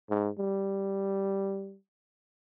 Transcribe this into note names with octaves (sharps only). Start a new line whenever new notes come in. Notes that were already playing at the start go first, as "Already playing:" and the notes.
G#2
G3